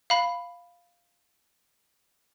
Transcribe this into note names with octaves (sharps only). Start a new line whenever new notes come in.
F5 B5